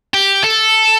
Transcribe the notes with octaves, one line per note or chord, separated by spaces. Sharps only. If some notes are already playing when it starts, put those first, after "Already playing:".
G4
A4